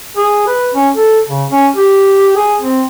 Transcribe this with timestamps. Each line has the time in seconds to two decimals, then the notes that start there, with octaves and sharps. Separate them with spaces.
0.17 G#4
0.47 B4
0.74 C#4
0.95 A4
1.28 C#3
1.52 C#4
1.76 G4
2.36 G#4
2.61 C4